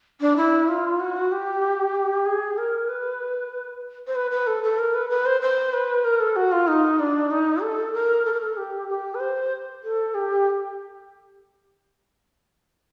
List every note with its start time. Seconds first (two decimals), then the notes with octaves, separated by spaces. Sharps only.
0.21 D4
0.37 E4
0.68 F4
1.00 F#4
1.31 G4
2.26 G#4
2.57 A#4
2.89 B4
4.07 C5
4.15 B4
4.31 B4
4.47 A4
4.63 A4
4.78 A#4
4.94 B4
5.10 B4
5.26 C5
5.41 C5
5.73 B4
6.04 A#4
6.20 A4
6.36 F#4
6.52 F4
6.67 D#4
6.99 D4
7.31 D#4
7.62 A4
7.93 A#4
8.25 A4
8.33 A#4
8.41 A4
8.57 G4
8.89 G4
9.14 B4
9.20 C5
9.83 A4
10.14 G4